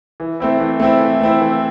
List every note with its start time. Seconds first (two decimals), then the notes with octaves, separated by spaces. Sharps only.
0.20 E3
0.40 A3 C4 E4
0.60 E3
0.80 A3 C4 E4
1.01 E3
1.21 A3 C4 E4
1.41 E3